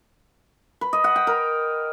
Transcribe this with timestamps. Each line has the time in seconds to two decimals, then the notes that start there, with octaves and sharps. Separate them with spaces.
0.81 B4
0.93 D#5
1.04 F#5
1.16 G5
1.27 A#4